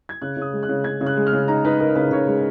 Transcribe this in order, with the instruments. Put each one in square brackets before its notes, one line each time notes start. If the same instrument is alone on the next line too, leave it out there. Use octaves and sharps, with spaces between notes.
[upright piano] G#6
C#3 F#6
C#3
D#6
G#3
F#6
C#3
C#3 G#6
C#3
F#6
G#3
F6
C#3
D#4 A#5
D#4 B4
D#4 A#4
C#3 B4
C#3 C#5
G#3